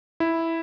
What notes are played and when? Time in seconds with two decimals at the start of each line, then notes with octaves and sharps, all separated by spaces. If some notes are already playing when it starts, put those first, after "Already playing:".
0.20 E4